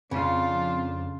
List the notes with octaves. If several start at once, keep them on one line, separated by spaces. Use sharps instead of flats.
F2 C#3 D4 F4